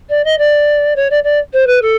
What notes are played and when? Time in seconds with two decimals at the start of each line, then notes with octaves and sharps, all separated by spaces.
0.09 D5
0.24 D#5
0.38 D5
0.96 C#5
1.10 D5
1.24 D5
1.53 C5
1.67 B4
1.82 A4